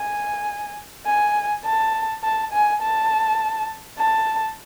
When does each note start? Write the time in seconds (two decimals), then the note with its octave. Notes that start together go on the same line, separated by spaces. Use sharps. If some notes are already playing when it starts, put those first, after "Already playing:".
Already playing: G#5
1.06 G#5
1.65 A5
2.24 A5
2.52 G#5
2.82 A5
3.99 A5